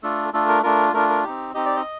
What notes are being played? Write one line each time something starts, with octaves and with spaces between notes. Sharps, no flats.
A3 D4 F4 A4
A3 D4 F4 A4
A#4
A3 D4 F4 A#4
A3 D4 F4 A#4
A#4
C4 D#4 G4
C4 D#4 G4 D#5
D5
D#5